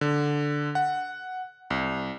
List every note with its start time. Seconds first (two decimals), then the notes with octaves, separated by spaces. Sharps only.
0.01 D3
0.75 F#5
1.70 C2